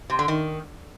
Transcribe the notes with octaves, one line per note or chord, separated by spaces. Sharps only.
C3
D3
D#3